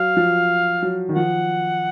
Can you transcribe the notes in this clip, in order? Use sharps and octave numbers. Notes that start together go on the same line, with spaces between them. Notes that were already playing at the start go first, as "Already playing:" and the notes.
Already playing: F#3 F5
F3
F#3
D#3
F3 F#5